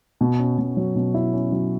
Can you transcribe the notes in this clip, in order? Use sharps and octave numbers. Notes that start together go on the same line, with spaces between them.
B2
C#4
B2
F#3
B2
E4
C#4
F#3